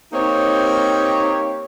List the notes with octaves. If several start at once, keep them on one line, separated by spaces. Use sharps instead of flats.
A#3 C4 D#4 G4 C#5